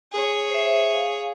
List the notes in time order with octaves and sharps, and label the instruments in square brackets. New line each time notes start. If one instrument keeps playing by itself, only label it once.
[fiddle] G#4 C#5
[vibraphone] C5 E5
F5